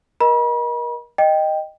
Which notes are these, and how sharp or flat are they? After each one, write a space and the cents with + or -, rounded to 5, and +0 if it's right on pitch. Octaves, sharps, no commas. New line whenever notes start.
A#4 +30 D#5 +0 B5 -40
D#5 -5 G5 +0